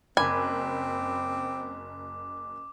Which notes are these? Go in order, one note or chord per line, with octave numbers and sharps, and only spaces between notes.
F#1 C4 G#5 B5 D6